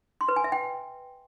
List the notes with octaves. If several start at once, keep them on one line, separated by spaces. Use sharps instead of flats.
C6
B4
G#5
E5
G5